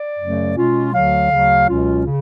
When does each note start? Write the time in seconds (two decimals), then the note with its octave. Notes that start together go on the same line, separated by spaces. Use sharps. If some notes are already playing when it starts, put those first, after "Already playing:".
Already playing: D5
0.19 F#2 C#3 F#3 A3
0.56 B2 G#3 C#4 F4
0.93 D2 D3 F#3 F5
1.31 D2 C#3 F#3
1.68 C#2 B2 F#3 C#4 F4
2.06 C#3